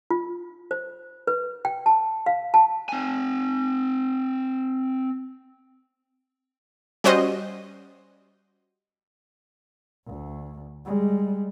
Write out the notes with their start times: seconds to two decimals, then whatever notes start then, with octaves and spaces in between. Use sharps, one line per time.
0.10 F4
0.71 C5
1.27 B4
1.65 G5
1.86 A5
2.26 F5
2.54 A5
2.89 C4 G#5
7.04 G3 C#4 F#4 C5 D#5
10.07 D2
10.86 G3 G#3